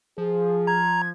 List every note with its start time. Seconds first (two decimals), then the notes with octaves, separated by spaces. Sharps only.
0.18 F3 G#4
0.67 A#5 G#6